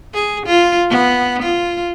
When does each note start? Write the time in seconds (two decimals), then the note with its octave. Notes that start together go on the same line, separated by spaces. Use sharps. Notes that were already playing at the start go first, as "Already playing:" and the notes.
0.14 G#4
0.46 F4
0.90 B3
1.42 F4